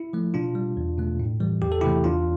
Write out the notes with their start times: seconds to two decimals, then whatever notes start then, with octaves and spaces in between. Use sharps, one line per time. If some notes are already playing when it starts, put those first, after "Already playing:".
Already playing: E4
0.13 F3 A3
0.34 B2 D4 F4
0.55 G3
0.77 E2
0.98 B2 A3
1.20 A2
1.40 E3 G3
1.62 E2 G4
1.72 A4
1.81 C3 E3 A3 E4 G4
2.04 E2 D4 F4